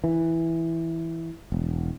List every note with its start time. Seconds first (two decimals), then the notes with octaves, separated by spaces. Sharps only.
0.04 E3
1.52 E1